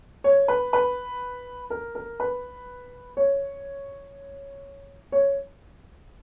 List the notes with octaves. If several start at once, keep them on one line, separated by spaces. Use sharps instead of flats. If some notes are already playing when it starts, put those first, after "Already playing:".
C#5
B4
B4
A#4
A#4
B4
C#5
C#5